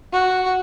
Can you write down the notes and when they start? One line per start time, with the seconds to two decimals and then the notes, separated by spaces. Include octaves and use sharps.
0.12 F#4